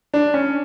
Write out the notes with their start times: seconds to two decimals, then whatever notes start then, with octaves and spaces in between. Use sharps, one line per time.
0.14 D4
0.34 C#4